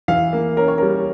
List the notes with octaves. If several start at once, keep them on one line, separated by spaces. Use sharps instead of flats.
E3 F5
A#3
C#4 A#4
C#5
G3 A#4